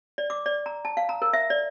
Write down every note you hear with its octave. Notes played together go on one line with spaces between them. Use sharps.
D5
D6
D5
A#5
A5
F5
A#5
A#4
E5
D5